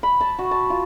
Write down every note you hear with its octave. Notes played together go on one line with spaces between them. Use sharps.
B5
A5
F#4
A5
F4